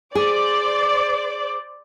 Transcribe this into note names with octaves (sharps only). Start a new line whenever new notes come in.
G#4 C5 D5 D6